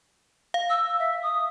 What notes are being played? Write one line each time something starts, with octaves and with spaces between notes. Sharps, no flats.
F5
E6
E5
D#6